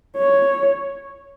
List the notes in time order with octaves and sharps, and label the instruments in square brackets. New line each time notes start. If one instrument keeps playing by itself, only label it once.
[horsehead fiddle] C#5